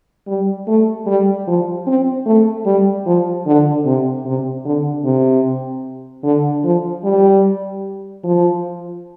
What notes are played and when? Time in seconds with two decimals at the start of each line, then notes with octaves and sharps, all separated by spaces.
0.28 G3
0.68 A3
1.07 G3
1.47 F3
1.87 C4
2.26 A3
2.66 G3
3.06 F3
3.46 D3
3.86 C3
4.26 C3
4.65 D3
5.05 C3
6.24 D3
6.65 F3
7.04 G3
8.24 F3